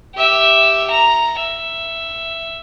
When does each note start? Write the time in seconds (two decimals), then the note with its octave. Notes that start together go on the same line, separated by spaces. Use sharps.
0.16 G4 E5
0.91 A#5
1.39 E5